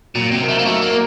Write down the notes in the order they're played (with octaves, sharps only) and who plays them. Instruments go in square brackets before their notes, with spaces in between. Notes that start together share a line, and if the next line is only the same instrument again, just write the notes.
[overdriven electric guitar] A#2 [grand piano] F#3
[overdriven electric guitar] C3
[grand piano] C4 D#4 A#4
[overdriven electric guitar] A3
A#3
[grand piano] F#3 [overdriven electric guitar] A3
[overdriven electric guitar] A#3
[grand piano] D#4 A#4